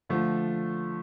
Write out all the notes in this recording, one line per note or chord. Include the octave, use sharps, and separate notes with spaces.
D3 F3 A3